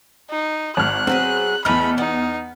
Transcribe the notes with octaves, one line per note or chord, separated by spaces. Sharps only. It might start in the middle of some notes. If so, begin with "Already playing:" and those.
D#4
G#1 F6 F#6
F#3 B3 C4 G#4
E2 E3 A3 D#4 B5 F6
B3 D#4